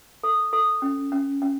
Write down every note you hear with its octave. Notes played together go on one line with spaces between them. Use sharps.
A4
A4
C#4
C#4
C#4